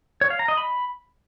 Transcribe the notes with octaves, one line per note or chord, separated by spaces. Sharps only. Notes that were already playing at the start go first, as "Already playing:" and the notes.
C#5
F5
A#5
D#5
B5